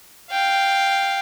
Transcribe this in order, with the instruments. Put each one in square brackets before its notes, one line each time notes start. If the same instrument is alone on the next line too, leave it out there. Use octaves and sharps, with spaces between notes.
[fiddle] F5 G5